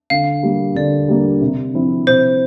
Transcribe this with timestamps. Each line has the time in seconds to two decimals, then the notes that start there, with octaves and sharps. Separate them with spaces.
0.10 D3 F5
0.43 G3 A#3
0.75 D3 D5
1.08 G3 A#3
1.41 C3
1.74 F3 C4 E4
2.07 C3 C5